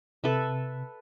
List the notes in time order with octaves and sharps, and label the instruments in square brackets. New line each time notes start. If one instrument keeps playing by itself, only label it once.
[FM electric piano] C3 [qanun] A4 B4 E5